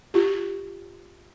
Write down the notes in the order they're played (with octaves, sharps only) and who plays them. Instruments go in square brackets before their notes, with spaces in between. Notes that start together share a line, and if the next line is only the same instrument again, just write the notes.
[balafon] F4 G4